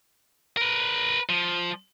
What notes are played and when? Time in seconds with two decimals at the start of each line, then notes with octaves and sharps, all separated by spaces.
0.57 A#4 B4
1.29 F3